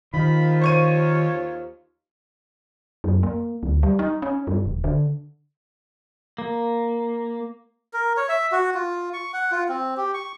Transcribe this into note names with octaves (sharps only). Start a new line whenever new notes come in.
D#2 D#3 F3 F4 B5
C5 C#5 C#6 D#7
F#2
A#3
D2
G3
D#4
C#4
G2
D#1
D3
A#3
A#4
C#5
E5
F#4
F4
C#6
F#5
F4
C4
G4
C#6